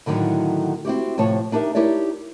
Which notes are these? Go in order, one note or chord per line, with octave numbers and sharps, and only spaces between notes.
A2 D3 D#3 F#3
C4 E4 F#4 G4
A2 C3 F3 C#5 A5
D4 D#4 G4 A#4 E5
D#4 E4 G4 A#4 C#5 D5